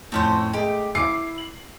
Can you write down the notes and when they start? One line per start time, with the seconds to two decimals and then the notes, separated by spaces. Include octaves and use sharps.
0.12 F2 A2 A3 C#4 C5
0.54 G#3 A3 G4
0.95 E4 D6 C7
1.38 F#7